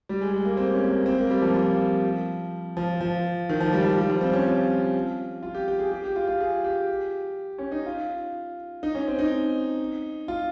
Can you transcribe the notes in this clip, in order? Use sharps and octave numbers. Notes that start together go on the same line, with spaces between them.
G3
G#3
G#3
A#3
C4
C#4
A#3
C4
A#3
G3
F3
F3
F3
F3
D#3
F3
G3
F3
G3
F3
C4
C#4
F4
F4
G4
G4
G#4
G4
G4
F4
F4
G#4
G4
C#4
D#4
F4
D#4
C#4
C4
D#4
F4